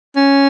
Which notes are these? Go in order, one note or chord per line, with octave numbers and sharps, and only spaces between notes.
C#4